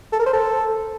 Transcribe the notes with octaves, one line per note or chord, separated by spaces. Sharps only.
A4
A#4
C5
A4